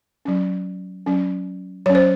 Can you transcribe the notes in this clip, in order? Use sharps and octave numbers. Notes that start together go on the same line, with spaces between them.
F#3 C#4
F#3 C#4
F#3 C#4 C#5
C5